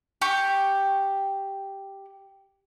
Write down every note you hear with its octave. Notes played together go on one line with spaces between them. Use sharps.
G4 C#6